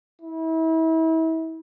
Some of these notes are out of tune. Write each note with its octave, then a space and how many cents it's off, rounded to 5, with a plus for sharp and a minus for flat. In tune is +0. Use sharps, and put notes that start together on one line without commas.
E4 -35